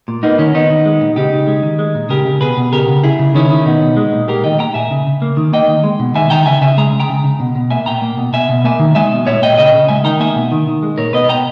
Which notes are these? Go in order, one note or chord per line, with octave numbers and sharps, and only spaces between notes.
A#2
A#3 B3 D#4
D#3 C#4
D#3 B3 D#4
D#3
G#3
A#2
C#3 D#4 G4
C#3
G#3
D#3
G#3
A#2
C#3 G4 A#4
C#3
B2 G#4 B4
B2
C#3 G4 A#4
C#3
C#3 E4 G#4
C#3
D#3 C#4 E4
D#3
B2 B3 D#4
B2
G#3
A#2
A#3 G4 A#4
D#3 D#5 G5
A#3 G5 A#5
A#2 E5 G#5
C#3
C#3
A#3
D#3
A#3 D#5 G5
D#3
G#3
B2
D#3 E5 G#5
D#3 G5 A#5
C#3 E5 G#5
C#3 E5 G#5
G#3 A#5
C#3
G5 A#5
C#3
C#3
B2
B2
A#3 E5 G#5
A#2 G5 A#5
A#3
B2
B2 E5 G#5
B2
A#3 E5 G#5
D#3
G#3 E5 G#5
B2
A#2 C#5 E5
A#2 D#5 G5
C#3 D#5 G5
C#3
G#3 E5 G#5
D#3 G5 A#5
A#3 E5 G#5
B2
D#3
D#3
G#3
A#2 A#4 C#5
B2 B4 D#5
B2 G5 A#5